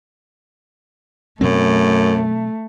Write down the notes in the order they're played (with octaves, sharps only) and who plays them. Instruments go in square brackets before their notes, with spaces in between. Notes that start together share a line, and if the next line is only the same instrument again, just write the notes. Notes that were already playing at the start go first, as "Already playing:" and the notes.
[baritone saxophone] F#2 [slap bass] B2 F#3 C4 [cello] A3